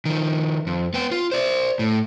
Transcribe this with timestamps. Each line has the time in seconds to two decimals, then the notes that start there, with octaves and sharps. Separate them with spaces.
0.05 D#3 F3
0.67 F2
0.94 B3 G5
1.11 F4
1.32 C5 D5
1.79 A2